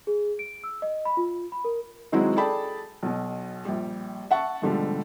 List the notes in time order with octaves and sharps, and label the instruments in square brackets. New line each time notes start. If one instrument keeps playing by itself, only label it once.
[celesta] G#4
D7
E6
D#5
B5
F4
B5
A#4
[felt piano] D#3 F#3 G#3 C4 E4 F#4
G#4 A4 D5 G5 A5 B5
B1 B2
A#1 G3
E5 F#5 A5 C#6
G#2 B2 D3 F3 G3 A3